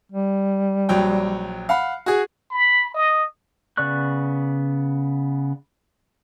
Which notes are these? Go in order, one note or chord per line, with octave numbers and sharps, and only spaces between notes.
G3
A#1 F#3 G5
F5 F#5 B5
F#4 G#4
B5
D#5
C#3 B3 D5 C#6 F#6